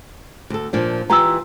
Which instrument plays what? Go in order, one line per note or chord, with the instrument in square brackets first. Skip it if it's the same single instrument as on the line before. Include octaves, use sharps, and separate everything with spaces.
[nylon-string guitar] D2 A4
A#2 F3 D4
[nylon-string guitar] E3 F4 G4 [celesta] A#5 E6